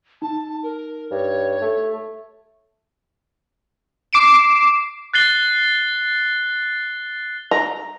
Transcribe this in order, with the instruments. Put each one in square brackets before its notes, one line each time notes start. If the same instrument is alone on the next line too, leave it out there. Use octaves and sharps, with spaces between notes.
[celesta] D#4 [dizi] A5
[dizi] A#4
[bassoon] G2 [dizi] C#5
[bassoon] A3
[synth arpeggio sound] D6 C7 D7 E7
[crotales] F#6 A6 C7 G7
[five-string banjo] A#5